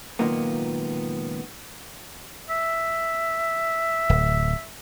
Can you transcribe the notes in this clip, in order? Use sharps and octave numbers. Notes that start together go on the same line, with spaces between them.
C#2 A#2 D#3 F#3 A#3 B3
E5
D1